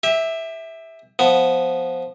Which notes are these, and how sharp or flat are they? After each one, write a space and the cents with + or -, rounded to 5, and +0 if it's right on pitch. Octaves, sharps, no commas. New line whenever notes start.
G4 +30 E5 -10
F3 +0 B3 +0